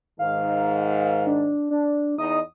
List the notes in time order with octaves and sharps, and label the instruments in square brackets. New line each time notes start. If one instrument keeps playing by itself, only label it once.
[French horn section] G#2 D#3 [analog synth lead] F5
[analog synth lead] D4
D4
[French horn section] E2 D#4 D#5 [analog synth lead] D#6